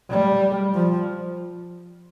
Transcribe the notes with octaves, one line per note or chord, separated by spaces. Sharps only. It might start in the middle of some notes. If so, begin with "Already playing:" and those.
G3
F3